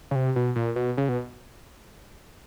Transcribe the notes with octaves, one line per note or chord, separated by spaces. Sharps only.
C#3
C3
B2
A#2
B2
C#3
B2